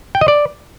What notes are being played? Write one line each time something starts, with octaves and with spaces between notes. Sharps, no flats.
G5
D#5
D5